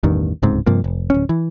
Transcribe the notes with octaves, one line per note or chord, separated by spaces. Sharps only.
A1 E2 G2 D#3
D1 C#2 G#2 C4
G2 C3 F3 A#3
F1
D1 C#4
E3